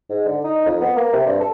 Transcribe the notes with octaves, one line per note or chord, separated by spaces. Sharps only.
G#2
D3
D#4
F2
B3
A#3
C3
G2
A4